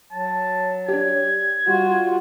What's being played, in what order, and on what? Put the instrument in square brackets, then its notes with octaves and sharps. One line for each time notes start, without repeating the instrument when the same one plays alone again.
[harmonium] F#3 [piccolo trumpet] A5
[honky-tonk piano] D4 G4 [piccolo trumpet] G#6
[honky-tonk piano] G3 [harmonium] F4 [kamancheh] F#4